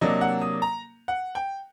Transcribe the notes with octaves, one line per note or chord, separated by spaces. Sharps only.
C3 F#3 A#3 D4 D#5
F#5
D#6
A#5
F#5
G5